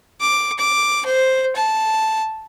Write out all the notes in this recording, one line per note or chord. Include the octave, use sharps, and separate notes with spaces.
D6
D6
C5
A5